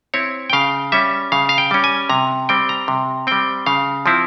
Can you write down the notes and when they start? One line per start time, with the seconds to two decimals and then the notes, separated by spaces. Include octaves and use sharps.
0.14 C4 E4 C#5
0.50 G5
0.53 C#3 F5
0.92 G3 C#4 E5
1.32 C#3 F5
1.49 F5
1.58 G5
1.71 G3 C#4
1.84 G#5
2.09 C3 A#5
2.49 G3 C4 G5
2.69 A#5
2.88 C3
3.27 G3 C4 G5
3.66 C#3 F5
4.06 F3 C4 E4